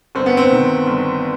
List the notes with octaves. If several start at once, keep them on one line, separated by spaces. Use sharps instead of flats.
G1 C4
B3
C4
D#3
G1